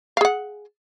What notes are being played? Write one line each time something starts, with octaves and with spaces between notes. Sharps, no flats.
G#4 F5 F#5